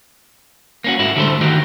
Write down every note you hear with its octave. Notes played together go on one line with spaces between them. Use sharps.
A#3 C#4 F#4
G#2 E4 F#4
D3 G3 A3 G4 A4 C5
D#3 D#4 F#4 G4